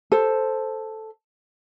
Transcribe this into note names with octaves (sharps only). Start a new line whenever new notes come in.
A4 C5